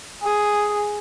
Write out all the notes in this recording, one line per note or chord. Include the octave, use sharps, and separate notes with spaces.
G#4